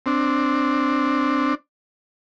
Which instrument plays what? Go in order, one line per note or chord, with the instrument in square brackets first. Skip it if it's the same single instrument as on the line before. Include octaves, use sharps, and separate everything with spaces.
[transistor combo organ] C4 D4